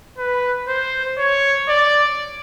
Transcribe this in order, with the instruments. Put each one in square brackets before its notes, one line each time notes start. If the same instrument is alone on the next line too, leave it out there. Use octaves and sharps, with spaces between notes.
[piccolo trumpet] B4
C5
C#5
D5